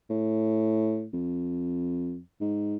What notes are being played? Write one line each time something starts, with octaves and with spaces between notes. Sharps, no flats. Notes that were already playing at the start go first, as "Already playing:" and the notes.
A2
F2
G#2